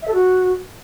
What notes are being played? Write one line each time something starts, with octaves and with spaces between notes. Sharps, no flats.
E5
A4
F#4